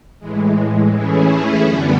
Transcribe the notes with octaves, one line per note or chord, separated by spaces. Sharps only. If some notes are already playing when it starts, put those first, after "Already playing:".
A2 E3 G#3
E3 A3 C#4 E4 G#4
F#2 D3 G3 B3